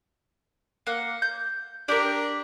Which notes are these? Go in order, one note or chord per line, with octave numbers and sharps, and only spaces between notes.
A#3 F#5
G6
D4 G4 A#4